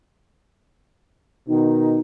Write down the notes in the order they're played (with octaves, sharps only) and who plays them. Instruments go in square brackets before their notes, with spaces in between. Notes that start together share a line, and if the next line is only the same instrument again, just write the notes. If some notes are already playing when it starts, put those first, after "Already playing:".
[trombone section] B2 D#3 [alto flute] D#4